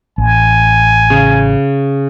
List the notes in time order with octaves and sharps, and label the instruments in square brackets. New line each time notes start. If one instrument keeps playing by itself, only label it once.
[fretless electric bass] A1 [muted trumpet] G#5
[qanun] C#3